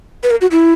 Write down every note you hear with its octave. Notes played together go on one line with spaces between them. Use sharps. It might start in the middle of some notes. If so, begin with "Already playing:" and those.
B4
A#4
F#4
E4